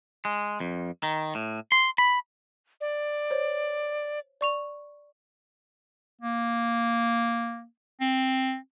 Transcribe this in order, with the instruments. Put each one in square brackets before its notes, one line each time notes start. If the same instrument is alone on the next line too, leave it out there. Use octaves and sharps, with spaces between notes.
[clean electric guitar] G#3
F2
D#3
A2
C6
B5
[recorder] D5
[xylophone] C5 C#5
D5 C#6 F7
[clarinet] A#3
C4